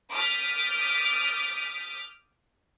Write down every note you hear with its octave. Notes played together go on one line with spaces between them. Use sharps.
D6 D#6 F6 G6 A6 B6